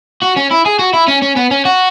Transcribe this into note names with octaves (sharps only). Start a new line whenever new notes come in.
F#4
C#4
E4
G#4
F#4
E4
C#4
C#4
B3
C#4
F#4